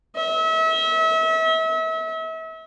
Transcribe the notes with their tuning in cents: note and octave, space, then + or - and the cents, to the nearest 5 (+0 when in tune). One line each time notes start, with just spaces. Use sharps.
E5 -35